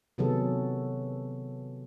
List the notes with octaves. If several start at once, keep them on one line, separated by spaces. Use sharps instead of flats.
C3 D#3 F#3 B3 G#4 A4